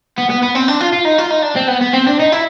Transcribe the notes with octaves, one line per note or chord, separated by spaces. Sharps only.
B3
B3
B3
C4
D4
F4
F4
D#4
F4
D#4
D4
C4
B3
B3
C4
D4
D#4
E4